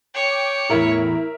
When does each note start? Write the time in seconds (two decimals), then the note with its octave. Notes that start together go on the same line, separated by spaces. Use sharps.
0.15 C#5 G5 D6
0.70 E2 A2 E4 A#4 E5